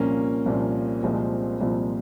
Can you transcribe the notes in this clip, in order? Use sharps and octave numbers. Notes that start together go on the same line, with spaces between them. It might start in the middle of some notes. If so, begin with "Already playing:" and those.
Already playing: C2 A#2 F3 A#3 C#4
C2 A#2 F3
C2 A#2 F3 G#3 C4
C2 A#2 F3